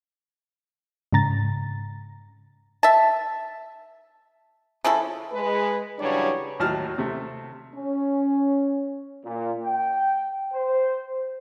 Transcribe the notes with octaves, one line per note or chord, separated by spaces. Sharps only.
G#2 C#3 A#5 A6
E5 A5
C#3 F3 E4 A4
G#3 B4
C#3 E3 F#3 G3 D4 C#5
D#2 A2 F#3 A5 F6
C3 A3
C#4
A#2
G5
C5